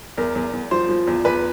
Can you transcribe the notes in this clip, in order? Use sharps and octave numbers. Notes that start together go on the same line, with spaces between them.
E2 A#4
E2
E2
F3 C5
F3
E2
E2 B4